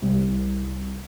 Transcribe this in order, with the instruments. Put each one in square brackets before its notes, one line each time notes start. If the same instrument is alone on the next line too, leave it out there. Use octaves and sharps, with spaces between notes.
[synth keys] C2